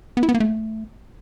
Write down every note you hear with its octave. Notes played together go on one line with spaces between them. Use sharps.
B3
E4
B3
A#3
A3